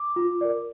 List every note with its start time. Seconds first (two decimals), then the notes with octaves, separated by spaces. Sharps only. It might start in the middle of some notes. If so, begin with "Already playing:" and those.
Already playing: D6
0.16 F4
0.41 A#4 D5